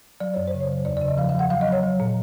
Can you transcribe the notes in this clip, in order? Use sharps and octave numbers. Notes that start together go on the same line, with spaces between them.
F#3 D5
F#2 C#5
C5
C#3
C#5
F#3
E2 D5
C#3 D5
D#5
F3 F5
F5
F3 F#5
F#3 F5
D#5
F#3 C#5
F#3
A#2